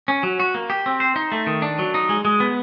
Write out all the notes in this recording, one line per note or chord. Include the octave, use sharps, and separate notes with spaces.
C#4
F#3
F#4
A#3
G4
C4
C5
D#4
A3
D#3
D4
F#3
D#4
G#3
G#3
B3